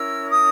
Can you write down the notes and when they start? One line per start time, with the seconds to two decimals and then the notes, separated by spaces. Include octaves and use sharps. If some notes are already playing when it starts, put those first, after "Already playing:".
Already playing: C#4 E4 A#4 E6
0.30 D#6